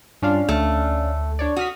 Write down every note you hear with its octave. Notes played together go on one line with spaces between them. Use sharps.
G2 C#4 D4 F4 F5
D2 A3
D4 C#5 D5
F#4 D#6 F6 B6